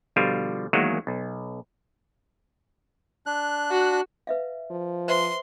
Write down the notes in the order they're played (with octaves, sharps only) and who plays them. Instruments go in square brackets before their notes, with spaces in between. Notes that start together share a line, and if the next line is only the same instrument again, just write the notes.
[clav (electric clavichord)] B2 D3 F3 G3 F4
E2 D#3 F#3 G#3 A#3
B1
[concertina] D4 F#6
[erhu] F#4
[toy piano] B4 E5 F5
[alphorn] F3
[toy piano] B4 C5 E5 [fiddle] C6